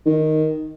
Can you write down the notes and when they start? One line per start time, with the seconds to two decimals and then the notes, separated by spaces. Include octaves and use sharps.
0.06 D#3